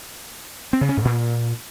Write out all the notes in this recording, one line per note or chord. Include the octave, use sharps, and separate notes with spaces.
C4
C#3
C#4
G#2
A#2